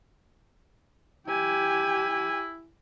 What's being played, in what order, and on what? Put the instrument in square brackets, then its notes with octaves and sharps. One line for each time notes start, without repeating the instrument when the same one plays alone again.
[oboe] E4 [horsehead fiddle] G4 G#5